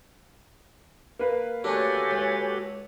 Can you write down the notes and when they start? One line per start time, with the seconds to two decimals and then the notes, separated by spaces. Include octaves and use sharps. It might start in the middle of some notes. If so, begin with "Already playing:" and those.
1.19 A#3 B4 F5
1.64 A3 C#4 D4 F#4 G4 A4 C#5 G#5
2.11 C#2